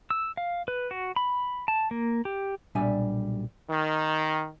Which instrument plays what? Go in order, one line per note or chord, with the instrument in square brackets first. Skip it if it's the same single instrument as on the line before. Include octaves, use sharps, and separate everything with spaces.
[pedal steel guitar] E6
F5
B4
F#4
B5
A5
A#3
G4
[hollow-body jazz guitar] B1 A#2 G3 D4 E5 G#5
[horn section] D#3